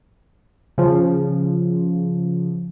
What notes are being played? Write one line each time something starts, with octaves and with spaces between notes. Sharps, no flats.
C#3 F3